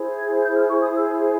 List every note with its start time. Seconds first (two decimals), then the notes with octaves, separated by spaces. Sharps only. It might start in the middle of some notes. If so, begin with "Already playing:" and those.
Already playing: E4 G#4 C5
0.15 G#6
0.41 G6
0.55 F6
0.68 C#6
0.82 D#6
0.94 E6